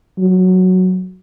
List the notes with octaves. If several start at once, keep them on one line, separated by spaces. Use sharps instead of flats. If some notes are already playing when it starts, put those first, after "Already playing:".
F#3